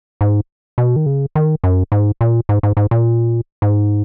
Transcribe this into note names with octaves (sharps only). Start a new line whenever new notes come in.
G#2
B2
D#3
C#3
D#3
F#2
G#2
A#2
G#2
G#2
G#2
A#2
G#2